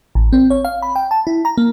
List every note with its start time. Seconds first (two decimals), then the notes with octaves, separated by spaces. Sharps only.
0.15 A1
0.33 C4
0.50 C#5
0.65 F5
0.82 B5
0.96 G5
1.11 A5
1.27 E4
1.45 A#5
1.58 A#3